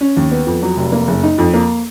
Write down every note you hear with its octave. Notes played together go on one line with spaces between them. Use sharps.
C#4
D#2
B3
F2
F#3
F1
A#3
F#1
D#4
F2
A#3